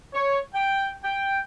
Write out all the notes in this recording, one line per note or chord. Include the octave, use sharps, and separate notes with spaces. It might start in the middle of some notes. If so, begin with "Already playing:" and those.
C#5
G5
G5